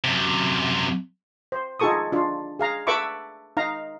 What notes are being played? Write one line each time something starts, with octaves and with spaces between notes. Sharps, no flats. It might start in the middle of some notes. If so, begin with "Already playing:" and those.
F#2 C3
C5
D#4 F4 G#4 A4 C#6 D#6
D4 F4
G#4 F5 A#5
A4 B4 E5 B5 C#6 D6
D#4 F5 A#5